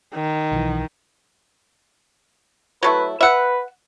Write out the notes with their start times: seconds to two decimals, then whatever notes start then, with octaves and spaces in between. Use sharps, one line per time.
0.15 D#3
0.52 B1 E3
2.83 F#3 A3 E4 B4
3.21 B4 E5 F#5